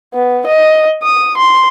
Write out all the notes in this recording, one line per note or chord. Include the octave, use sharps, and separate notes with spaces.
B3
D#5
D#6
C6